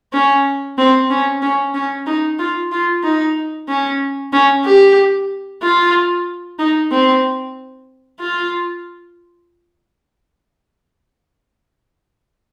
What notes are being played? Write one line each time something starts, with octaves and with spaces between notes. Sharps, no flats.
C#4
C4
C#4
C#4
C#4
D#4
F4
F4
D#4
C#4
C#4
G4
F4
D#4
C4
F4